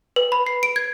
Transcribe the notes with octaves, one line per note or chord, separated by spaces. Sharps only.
B4
B5
C7
D7
G#6